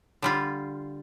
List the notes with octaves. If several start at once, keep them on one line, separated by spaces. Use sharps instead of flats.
D3 G3 F4